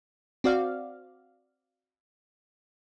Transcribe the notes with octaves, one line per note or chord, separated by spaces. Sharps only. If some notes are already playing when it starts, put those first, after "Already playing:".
C4 F#4 D5 F5